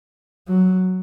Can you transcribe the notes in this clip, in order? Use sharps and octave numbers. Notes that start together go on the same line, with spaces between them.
F#3